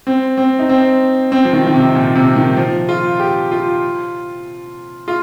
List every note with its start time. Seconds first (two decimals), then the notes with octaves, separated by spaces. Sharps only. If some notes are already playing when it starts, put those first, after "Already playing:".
0.07 C4
0.38 C4
0.59 D#4
0.69 C4
1.32 C4
1.45 F3
1.53 D#3
1.67 D#3
1.74 C3
1.95 A#2
2.15 C3
2.36 D#3
2.57 F3
2.89 F4
3.19 G4
3.52 F4
5.08 F4